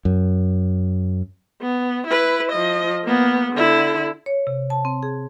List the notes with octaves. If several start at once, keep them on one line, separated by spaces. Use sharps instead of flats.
F#2
B3
E4 B4
F3 D#5
A#3 B3
D3 E4
C#5
C3
A5
C4
G#4